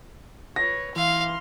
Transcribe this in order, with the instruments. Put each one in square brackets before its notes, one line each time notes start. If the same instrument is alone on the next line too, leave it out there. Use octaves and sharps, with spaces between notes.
[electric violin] B4 C#5 [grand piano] A#6
[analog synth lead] E3 [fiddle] F5 [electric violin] C6 F6